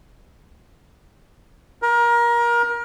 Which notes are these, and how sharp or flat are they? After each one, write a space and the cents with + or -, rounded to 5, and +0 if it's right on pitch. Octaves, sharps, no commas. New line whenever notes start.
A#4 +25